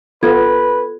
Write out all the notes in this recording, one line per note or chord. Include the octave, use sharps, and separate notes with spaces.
B3 F4 A4 B4 G#6